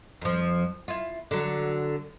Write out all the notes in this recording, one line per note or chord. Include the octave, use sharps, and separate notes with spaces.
F2 F3
E4 F4
D3 F#3